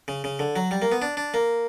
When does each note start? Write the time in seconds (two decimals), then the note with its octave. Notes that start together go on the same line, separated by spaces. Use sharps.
0.08 C#3
0.24 C#3
0.39 D3
0.56 F#3
0.71 G3
0.82 A#3
0.92 B3
1.02 D4
1.17 D4
1.34 A#3